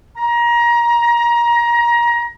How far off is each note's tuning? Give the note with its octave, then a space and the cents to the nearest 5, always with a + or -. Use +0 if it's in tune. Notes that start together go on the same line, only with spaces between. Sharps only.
A#5 +25